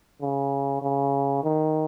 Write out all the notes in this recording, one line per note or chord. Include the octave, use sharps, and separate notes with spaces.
C#3
C#3
D#3